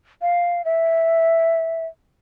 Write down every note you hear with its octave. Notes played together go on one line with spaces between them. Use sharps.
F5
E5